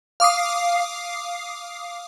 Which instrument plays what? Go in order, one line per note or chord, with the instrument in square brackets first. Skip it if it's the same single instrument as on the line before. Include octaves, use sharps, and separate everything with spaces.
[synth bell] F5 D6 D#6 C7